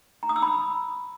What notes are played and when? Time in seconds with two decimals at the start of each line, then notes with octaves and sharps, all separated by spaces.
0.23 A#5
0.29 D#6
0.36 E6
0.42 B5